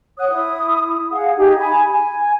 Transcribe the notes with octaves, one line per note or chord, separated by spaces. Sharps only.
C#5 F#5 D#6 F#6
E4 D#6
G#4 F5 F#5
D#4 G4 G#4
G#5 B5
G#5